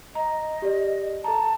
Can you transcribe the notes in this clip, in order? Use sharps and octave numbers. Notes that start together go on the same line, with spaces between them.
D#5 A#5
G4 D5
A4 A5 A#5